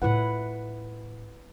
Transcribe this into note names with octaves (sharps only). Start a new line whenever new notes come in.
A2 E4 F4 B4 F#5